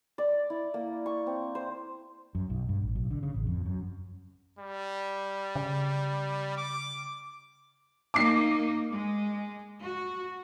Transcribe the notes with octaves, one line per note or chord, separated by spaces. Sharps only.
D5
E4
A#3
C#6
C4
C5
F#2
B1
G2
A1
B1
D3
C#3
A1
F2
F#2
G3
C#3
D6
A#3 D#4 D6 C7
G#3
F#4